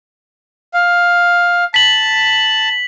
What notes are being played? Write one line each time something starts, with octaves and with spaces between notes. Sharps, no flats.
F5
A5 B6 F#7